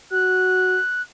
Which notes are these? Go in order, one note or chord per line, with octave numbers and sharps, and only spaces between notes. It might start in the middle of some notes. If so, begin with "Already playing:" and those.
F#4 F#6